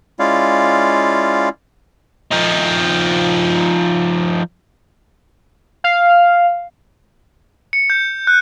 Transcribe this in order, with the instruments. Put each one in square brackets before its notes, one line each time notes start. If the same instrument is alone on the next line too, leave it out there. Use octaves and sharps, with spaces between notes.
[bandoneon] G#3 C#4 E4 F4 D5 F5
[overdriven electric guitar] F3 D#4
[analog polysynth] F5
[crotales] C#7
G6
F#6